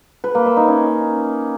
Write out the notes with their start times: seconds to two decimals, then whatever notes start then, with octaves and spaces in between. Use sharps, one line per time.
0.24 B4
0.35 A#3
0.46 E5
0.57 D#4
0.68 C#4